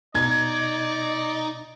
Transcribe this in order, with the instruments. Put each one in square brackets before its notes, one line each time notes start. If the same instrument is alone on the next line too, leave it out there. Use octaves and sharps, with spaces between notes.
[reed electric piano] B2 [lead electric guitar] D#4 [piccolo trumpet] D5 [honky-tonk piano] G#6